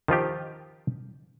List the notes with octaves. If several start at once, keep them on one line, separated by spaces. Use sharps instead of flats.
D#3 F3 F4 G4